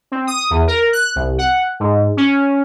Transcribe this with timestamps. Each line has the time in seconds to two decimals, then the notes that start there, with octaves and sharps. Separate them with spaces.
0.12 C4
0.27 D#6
0.50 E2
0.67 A#4
0.93 F#6
1.16 C2
1.38 F#5
1.80 G#2
2.17 C#4